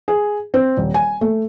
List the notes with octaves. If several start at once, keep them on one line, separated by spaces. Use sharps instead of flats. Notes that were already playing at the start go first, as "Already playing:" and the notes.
G#4
C4
D#1
G#5
A3